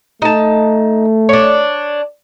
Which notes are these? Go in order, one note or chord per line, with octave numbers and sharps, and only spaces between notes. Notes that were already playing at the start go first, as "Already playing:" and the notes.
A3 D#4 A5
D4 C#5